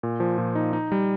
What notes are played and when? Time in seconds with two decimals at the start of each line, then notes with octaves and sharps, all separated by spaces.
0.03 A#2
0.20 F3
0.38 A#2
0.55 D#4
0.73 D#4
0.92 G3